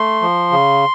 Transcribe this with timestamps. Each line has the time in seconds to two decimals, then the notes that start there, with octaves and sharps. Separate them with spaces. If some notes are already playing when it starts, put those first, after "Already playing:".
Already playing: A3 C6
0.22 F3
0.52 C#3